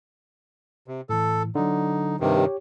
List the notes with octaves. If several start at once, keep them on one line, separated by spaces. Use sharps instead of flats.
C3
A2 E3 A4
D3 F#3 D#4
G2 C3 D#3
G4 C#5